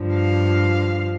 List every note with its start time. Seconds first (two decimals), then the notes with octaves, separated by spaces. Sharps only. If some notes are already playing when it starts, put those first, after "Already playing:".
Already playing: G2 D3 F3
0.14 F5